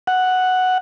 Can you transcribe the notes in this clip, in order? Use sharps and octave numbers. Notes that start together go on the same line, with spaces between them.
F#5